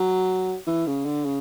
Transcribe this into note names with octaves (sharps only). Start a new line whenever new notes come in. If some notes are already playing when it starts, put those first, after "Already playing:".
Already playing: F#3
E3
C#3
D3
C#3